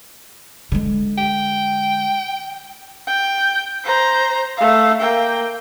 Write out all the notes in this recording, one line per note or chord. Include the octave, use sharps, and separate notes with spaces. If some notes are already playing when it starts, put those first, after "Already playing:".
D3 G#3
G5
G5
C5 A#5
A3 F5
A#3 G5